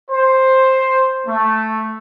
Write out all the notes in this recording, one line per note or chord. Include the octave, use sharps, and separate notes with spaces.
C5
A3